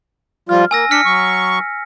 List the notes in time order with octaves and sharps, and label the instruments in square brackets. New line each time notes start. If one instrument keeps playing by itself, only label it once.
[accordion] F3 G3 F4 [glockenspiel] F6
[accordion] A#3 [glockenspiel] G#5 E6 A#6
[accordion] D4 [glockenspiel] F6 B6 C#7
[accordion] F#3 C#6